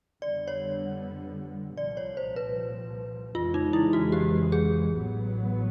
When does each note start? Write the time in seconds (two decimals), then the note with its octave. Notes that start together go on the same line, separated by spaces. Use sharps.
0.22 F2 D3 G3 B3 D5
0.48 C#5
1.77 C2 A#2 F3 D5
1.97 C#5
2.17 C5
2.36 B4
3.35 F2 C#3 E3 G#3 F4
3.54 D#4
3.73 E4
3.93 F#4
4.12 G4
4.52 G#4
4.91 A1 A2 F#3 B3